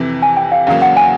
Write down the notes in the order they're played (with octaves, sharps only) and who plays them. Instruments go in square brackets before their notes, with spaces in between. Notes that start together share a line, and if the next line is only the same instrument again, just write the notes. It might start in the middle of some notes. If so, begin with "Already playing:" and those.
Already playing: [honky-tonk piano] F2 C3 E3
[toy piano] G#5
G5
F5
[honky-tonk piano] E2 C#3 F#3 A#3 [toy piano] F5
[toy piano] F#5
G#5